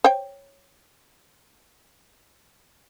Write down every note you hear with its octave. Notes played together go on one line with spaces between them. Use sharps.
C5 C#5 G5